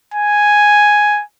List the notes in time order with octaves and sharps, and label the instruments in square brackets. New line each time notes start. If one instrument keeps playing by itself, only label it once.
[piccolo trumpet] G#5